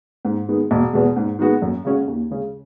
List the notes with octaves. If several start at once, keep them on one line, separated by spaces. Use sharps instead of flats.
G#2
D#3 G#3 B3
E1
E2 B2 G#3
G#2
D#3 G#3 B3 F#4
F#2
C#3 G#3 C#4 F#4
D#2
C#3 G#3 C#4